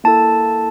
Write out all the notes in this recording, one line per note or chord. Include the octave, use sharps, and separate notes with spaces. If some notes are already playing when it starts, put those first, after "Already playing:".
A#3 E4 A4 A5